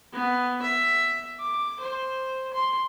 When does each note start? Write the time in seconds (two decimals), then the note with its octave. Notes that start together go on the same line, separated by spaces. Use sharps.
0.13 B3
0.62 E5
1.40 D6
1.80 C5
2.54 C6